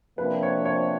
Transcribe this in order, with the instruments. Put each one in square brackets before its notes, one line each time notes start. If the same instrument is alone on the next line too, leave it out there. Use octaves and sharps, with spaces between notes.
[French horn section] C3 F3 A#3 D4 [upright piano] B4
[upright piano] C#5
C#5